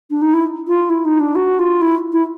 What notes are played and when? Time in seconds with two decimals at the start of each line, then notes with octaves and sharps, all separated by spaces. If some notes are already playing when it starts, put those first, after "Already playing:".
0.10 D4
0.21 D#4
0.33 E4
0.67 F4
0.89 E4
1.04 D#4
1.19 D4
1.35 F#4
1.59 F4
1.81 E4
2.12 E4